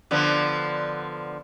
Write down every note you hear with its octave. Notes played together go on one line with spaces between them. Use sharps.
D3 F3 B3